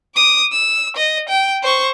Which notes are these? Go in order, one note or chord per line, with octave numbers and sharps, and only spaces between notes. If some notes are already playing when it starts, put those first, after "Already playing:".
D6 D#6
E6
D#5
G5
C5 C#6